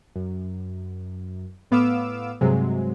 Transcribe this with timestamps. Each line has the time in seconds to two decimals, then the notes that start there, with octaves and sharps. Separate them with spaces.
0.16 F#2
1.71 A2 B3 F5 D6 E6
2.41 G2 C3 F#3 G#3